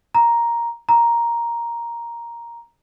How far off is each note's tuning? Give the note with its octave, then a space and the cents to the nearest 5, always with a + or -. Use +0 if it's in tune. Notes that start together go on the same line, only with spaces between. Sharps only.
A#5 +5
A#5 +5